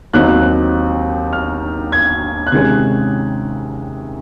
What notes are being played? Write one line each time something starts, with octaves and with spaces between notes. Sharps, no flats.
D#2 D#3 F#3 C4 D#4 F#6
F6
G#6
F#6
C3 D#3 G#3 C#4 G#6